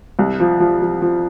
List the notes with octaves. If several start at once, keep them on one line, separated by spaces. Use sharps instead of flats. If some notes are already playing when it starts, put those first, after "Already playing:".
C2
F3
F3
F3
F3